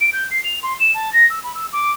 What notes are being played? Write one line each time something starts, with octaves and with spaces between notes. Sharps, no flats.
D7
G6
C7
F7
C6
E7
A5
A#6
E6
B5
E6
D6